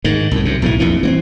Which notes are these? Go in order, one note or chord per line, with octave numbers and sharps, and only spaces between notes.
G#2 D#3
C2 A2
F#2 C3
B1 A2 D#3 E3
A#1 F2 A#2 E3
E3 B3 C4